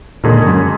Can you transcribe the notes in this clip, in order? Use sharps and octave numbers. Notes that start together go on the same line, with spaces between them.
D#2 A#2 D3 G#3 D#4 G#4
F#2